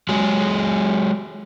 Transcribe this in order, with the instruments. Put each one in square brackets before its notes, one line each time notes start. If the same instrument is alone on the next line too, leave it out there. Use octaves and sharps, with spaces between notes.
[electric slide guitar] F#3 G#3 G#4